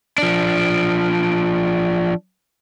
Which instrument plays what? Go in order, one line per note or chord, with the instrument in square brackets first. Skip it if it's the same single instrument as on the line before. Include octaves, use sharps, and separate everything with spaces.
[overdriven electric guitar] F3 D4